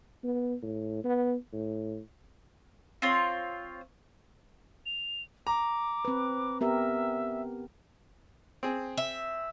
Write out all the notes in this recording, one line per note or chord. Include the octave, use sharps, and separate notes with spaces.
B3
A2
B3
A2
C4 F4 C#5
F7
A#5 D6
C4 B4
B3 G4 A#4 E5
C4 G#4
E5